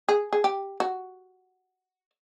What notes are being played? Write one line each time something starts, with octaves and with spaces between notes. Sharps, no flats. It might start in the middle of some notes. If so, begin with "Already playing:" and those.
G#4
G#4
G4
F#4